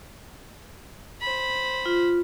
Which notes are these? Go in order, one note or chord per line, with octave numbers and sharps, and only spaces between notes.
C5 B5
F4